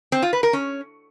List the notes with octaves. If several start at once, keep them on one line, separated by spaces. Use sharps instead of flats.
C4
F4
B4
A#4
C#4